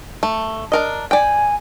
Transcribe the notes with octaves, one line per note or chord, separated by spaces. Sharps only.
A3
D4 A#4 D#5
D5 G5 G#5